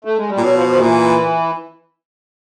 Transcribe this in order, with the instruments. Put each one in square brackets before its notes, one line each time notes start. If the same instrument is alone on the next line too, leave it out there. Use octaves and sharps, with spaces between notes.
[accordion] A3
G#3
G3
[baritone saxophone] A#2
[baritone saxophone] B2 [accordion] F#3
[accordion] F3
F3
D#3
[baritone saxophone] A#2 [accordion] E3